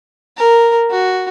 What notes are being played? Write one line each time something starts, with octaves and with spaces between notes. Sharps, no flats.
A#4
F#4